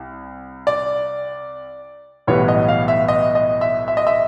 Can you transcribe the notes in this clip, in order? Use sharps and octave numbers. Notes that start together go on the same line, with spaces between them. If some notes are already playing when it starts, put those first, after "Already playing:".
Already playing: C2
D5
B1 A2 E3 G3 B3 C#5
D#5
F5
E5
D#5
D#5
E5
E5
D#5
E5